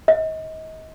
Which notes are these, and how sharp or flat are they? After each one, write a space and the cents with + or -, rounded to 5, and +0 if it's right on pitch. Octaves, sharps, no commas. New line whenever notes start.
D#5 +30